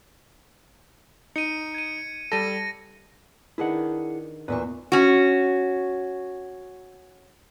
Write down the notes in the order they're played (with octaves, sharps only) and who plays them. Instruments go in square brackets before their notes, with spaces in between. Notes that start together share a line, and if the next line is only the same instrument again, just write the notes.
[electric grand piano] D#4 [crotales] C#7 D#7
[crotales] G#6 D#7
[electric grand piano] G3 A4 [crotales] A#6 D#7
[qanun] D#3 D4 B4 [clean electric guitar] E4 G#4 F#5
[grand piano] E2 A#2 [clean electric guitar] B4 [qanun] C5 E5 C#6
[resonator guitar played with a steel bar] C#4 F#4